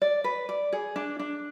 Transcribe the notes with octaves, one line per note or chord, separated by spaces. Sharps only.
D5
B4
D5
G#4
D4
D4